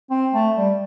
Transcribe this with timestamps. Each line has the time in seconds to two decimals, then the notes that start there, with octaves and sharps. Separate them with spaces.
0.10 C4
0.34 A3
0.57 G3